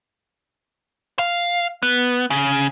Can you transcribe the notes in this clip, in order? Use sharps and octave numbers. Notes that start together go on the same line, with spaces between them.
F5
B3
C#3